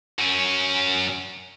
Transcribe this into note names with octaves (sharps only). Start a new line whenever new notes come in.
F#2 C#4